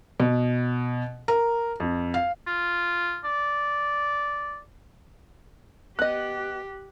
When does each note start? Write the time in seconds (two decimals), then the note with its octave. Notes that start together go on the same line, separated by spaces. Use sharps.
0.20 B2
1.28 A#4
1.80 F2
2.14 F5
2.47 F4
3.24 D5
5.99 B3 G4 D#5 F#6